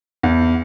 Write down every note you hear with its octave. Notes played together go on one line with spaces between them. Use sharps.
E2